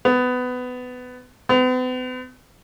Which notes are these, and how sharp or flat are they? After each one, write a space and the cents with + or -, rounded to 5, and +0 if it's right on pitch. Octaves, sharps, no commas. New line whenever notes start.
B3 +20
B3 +45